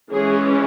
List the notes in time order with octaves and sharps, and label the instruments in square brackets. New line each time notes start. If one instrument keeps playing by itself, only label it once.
[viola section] E3 G#3 C#4 G#4